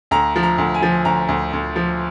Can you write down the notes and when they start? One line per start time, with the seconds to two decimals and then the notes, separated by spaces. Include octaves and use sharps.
0.11 D2 A#5
0.36 F3
0.43 A#5
0.58 D2
0.74 G#5
0.82 F3
1.05 D2 A#5
1.29 D2
1.53 D2
1.76 F3